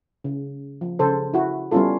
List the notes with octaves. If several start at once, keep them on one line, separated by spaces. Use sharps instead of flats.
C#3
F3
C#3 A4 C5
E4 F#4
G3 B3 C#4 E4 F4 A4